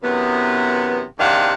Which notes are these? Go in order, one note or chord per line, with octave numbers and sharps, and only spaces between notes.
F#2 C3 E3 B3
E2 C3 D#3 D4 F5 F#5